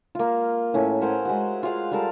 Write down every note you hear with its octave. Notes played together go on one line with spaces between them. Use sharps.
A#3 F4
A2 C#4 E4
A#4 C5 F#5 G#5
G#3 F#4 F#5
F4 G#4 F5 F#5
G3 A4 A#4